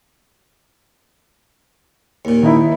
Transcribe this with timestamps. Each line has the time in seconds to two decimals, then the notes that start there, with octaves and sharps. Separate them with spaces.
2.25 D#2 A#2
2.43 D#3 D#4 E4